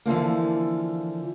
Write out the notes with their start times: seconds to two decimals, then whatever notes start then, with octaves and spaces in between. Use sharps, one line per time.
0.06 D3 E3 F3 A#3